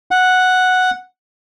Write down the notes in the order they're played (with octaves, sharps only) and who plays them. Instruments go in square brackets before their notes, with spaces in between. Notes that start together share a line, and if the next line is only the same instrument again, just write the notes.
[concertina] F#5